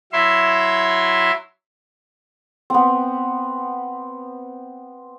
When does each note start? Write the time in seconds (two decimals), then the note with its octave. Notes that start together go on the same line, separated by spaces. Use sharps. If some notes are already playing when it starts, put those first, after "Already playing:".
0.13 F#3 E4 E5 C6
2.70 B3 C4